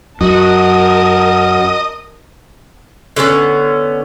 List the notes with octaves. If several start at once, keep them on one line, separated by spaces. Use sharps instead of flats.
F#2 F#4 A#4 D#5 A5
D3 A3 B3 C#4